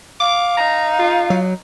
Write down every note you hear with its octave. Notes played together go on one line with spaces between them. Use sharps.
F5 D6
D#4 A#5
F4
F#3